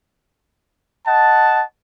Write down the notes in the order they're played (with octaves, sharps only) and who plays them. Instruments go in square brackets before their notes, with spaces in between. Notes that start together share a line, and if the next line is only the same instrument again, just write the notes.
[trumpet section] D#5 F#5 A5